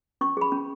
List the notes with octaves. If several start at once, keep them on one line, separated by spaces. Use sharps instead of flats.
C#4 C#6
G#4 B5
C#4